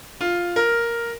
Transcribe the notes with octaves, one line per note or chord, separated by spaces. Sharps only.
F4
A#4